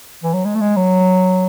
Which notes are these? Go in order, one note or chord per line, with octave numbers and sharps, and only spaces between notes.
E3
F#3
G#3
A3
G#3
F#3